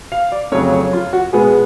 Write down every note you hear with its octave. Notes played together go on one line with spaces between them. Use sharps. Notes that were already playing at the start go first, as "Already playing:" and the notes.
F5
D5
F2 C#3 F#3 A3 C#5
C#5
F4
F#4
B2 G#3 B3 G#4